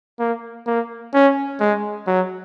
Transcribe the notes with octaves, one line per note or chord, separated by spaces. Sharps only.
A#3
A#3
C#4
G#3
F#3